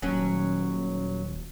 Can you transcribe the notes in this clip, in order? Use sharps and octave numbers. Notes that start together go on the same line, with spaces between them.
D#1 F#3 C#4